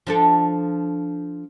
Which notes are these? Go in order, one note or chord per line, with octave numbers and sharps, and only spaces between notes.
F3 D4 A4